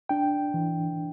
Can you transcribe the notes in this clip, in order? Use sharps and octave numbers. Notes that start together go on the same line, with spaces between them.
D4 G5
E3